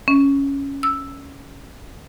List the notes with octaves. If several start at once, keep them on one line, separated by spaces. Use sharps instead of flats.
C#4
E6